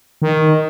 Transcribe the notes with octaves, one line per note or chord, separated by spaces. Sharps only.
D#3